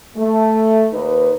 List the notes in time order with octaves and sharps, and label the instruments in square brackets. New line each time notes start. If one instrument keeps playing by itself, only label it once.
[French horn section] A3
D#2 D#4 B4